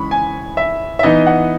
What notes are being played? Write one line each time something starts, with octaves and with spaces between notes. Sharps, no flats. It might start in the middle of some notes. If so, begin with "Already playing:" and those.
Already playing: C#3 E3 G#3 B5 C#6
G#5
E5
E5
E3 B3 D#4 D#5
F#5